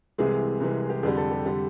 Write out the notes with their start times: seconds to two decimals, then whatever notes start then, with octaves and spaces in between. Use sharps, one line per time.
0.18 C2 C3 E3 G#3 G#4
0.60 C2 C3 E3 G#3
0.90 G4
1.03 F2 D3 G3 G#4
1.17 A4
1.31 G4
1.46 D3 G3